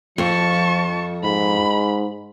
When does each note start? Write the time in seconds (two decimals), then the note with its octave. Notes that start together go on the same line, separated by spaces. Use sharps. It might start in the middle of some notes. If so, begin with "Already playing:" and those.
0.18 F2 F3 A5 C#6
1.24 G#2 B5